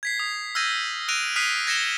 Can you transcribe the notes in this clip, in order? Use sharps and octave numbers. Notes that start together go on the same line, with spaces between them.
G#6 B6 C7
D#6
E6 F6 G6 G#6 A#6 D#7
E6 F#6 A#6 D7 D#7 F7
D#6 F6 F#6 B6 C7 D#7
G#6 A#6 C#7 E7 G7